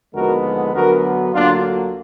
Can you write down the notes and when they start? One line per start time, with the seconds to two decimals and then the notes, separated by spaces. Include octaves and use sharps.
0.15 D#2 D3 F3 G#3 B3 F#4 A#4
0.74 D2 D3 F#3 B3 F#4 A#4
1.33 D2 D3 F#3 A#3 D4 F4